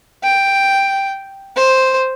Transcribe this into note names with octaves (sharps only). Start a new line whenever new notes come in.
G5
C5